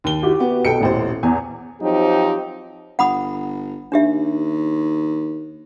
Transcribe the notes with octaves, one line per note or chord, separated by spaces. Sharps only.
D#2 G7
E4 F#4 G4
B3
B1 A4 G5 C#7
D#1 A1 C5
E2 G#5
F3 F#3 C4 D#4 G4
G1 F#5 B5 D#6
D#2 D4 G4 E5